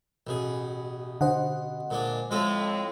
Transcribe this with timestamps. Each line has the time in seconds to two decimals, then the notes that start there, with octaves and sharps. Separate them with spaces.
0.27 A1 B2 G#4
1.21 D3 C5 D#5 F#5
1.90 A#2 G#3 D4
2.31 A2 F3 G#3 C4 A4